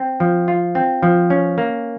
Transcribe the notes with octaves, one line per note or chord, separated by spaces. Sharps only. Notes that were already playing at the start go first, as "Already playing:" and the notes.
Already playing: C4
F3
F4
C4
F3
C#4
A#3